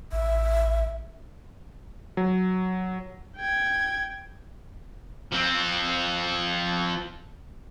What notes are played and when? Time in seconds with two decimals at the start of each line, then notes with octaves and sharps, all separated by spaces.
0.12 A1 E5
2.17 F#3
3.36 G5 G#6
5.33 F3 C4